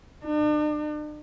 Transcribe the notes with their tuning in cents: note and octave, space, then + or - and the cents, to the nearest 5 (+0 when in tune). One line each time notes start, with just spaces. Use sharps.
D4 +45